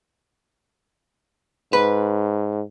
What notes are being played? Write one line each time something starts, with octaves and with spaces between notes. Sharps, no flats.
G#2 B4